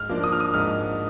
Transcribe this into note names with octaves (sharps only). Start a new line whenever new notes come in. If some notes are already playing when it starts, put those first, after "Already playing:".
Already playing: G#2 F6
F3 A#3 D4
D#6
F6
D#6
G#2 F6